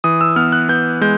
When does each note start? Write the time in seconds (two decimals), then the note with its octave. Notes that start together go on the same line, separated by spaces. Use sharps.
0.04 E3 D#6
0.21 E6
0.36 B3 F6
0.52 F#6
0.69 B3 G6
1.01 G#3 G6